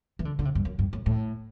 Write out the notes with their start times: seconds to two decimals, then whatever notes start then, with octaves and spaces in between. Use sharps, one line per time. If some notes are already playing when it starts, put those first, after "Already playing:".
0.19 E3
0.25 D3
0.39 D3
0.45 C3
0.55 G2
0.65 F#2
0.79 G2
0.93 A2
1.06 A2